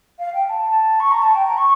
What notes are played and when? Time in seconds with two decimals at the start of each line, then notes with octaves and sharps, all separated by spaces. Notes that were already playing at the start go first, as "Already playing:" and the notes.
0.18 F5
0.33 G5
0.48 A5
0.99 C#6
1.11 A#5
1.21 A5
1.34 G5
1.45 A#5
1.57 C#6